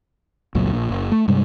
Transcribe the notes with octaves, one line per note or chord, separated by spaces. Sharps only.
G1 C#2 A#2 F#3
A#1 A#2
F#1
A3
G2 C3 G3 G#3